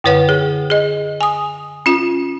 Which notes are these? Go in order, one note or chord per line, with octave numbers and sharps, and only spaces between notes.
F#2 D3 B4 C#5 F#5 G5
G#4
G#4 D#5
G#5 D#6
C#4 F4